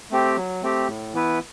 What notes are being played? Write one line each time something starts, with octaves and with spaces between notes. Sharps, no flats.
A3 C4 G4
F#3
A3 C4 G4
A2
E3 B3 E4 B4